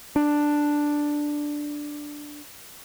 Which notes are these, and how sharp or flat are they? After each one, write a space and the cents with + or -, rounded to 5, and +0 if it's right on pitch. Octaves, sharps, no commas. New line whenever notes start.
D4 +5